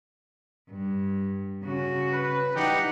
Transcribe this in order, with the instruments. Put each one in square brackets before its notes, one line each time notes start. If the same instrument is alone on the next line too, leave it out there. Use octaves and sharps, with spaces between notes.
[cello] G2
C#3 F#4
[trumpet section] B4
[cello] E3 F#5 [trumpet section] G3 D#4 G4